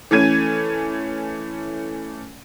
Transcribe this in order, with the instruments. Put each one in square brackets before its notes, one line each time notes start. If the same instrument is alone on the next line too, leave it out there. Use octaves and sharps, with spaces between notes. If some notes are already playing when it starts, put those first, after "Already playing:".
[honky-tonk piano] E3 A3 C#4 G#6 D#7